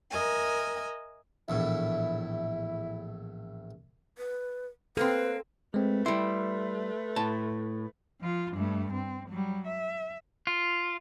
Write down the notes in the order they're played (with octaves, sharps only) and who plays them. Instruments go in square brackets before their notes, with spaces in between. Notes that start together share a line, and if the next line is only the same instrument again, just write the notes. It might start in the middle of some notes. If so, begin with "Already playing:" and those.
[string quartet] A#4 D#5 E5 G#5
[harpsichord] A#1 E2 A2 [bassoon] E4
[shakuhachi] B4
[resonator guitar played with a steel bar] A#3 C4 [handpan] A4 [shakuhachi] B4
[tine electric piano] G#3 C4 [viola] A3 B4
[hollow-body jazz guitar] G3 E4 [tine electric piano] E5 C6
[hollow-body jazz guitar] A2 A5
[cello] F3 F4
G2 A3
C4
F#3 G3
E5
[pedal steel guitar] F4